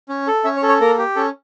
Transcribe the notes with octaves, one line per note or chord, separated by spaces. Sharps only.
C#4
A4
C#4 E5
C#5
A4
C#5
A#3 A#4
G4
C#4 A4